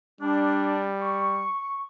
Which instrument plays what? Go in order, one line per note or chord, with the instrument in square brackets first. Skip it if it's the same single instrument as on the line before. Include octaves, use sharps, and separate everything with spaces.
[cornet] G3 [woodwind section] D4
[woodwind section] C#6